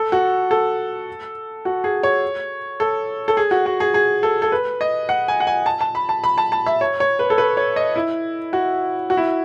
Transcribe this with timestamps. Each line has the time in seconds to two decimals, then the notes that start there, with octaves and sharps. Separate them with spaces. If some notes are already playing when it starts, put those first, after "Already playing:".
Already playing: A4
0.12 F#4
0.51 A4
1.65 F#4
1.84 G#4
2.03 C#5
2.80 A4
3.28 A4
3.37 G#4
3.51 F#4
3.66 F#4
3.80 G#4
3.94 G#4
4.23 A4
4.42 A4
4.52 B4
4.81 D#5
5.09 F#5
5.28 G#5
5.40 F#5
5.47 G#5
5.66 A5
5.81 A5
5.95 B5
6.09 A5
6.24 B5
6.38 A5
6.52 A5
6.66 E5
6.81 C#5
7.00 C#5
7.19 B4
7.30 A4
7.38 B4
7.57 C#5
7.76 D#5
7.96 E4
8.53 F#4
9.10 F#4
9.17 E4